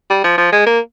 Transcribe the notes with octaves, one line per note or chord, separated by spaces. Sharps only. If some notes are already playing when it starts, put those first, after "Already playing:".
G3
F3
F3
G#3
A#3